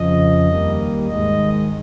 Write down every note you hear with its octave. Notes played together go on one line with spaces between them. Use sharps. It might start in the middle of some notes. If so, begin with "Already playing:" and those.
Already playing: F2 C#3 F3 D#5
D#2 D#3 G3 A#3
G#2 D#3 G#3 D#5